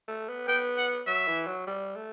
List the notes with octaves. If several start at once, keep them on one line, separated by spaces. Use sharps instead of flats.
A3
B3
B3 G5
F#5
F#3 E5
E3
F#3
G3
A3